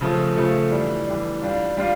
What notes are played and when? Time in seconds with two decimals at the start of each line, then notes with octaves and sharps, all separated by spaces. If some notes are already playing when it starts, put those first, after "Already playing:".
0.01 C#3 F3 A3
0.37 C#3 F3 A3
0.71 E3 G3 D4
1.07 E3 G3 D4
1.42 G3 D4 F4
1.77 G3 D4 F4